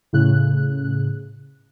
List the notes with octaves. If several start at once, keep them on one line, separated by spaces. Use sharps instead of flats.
A2 C#3 F#6